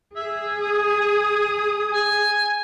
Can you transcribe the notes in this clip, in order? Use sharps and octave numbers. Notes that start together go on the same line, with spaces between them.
G#4 E5
D#6
G#5